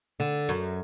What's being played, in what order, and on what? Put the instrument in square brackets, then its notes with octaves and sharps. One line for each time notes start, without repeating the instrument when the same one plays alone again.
[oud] D3
F#2